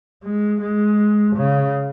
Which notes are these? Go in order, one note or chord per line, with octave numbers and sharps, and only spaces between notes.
G#3
G#3
C#3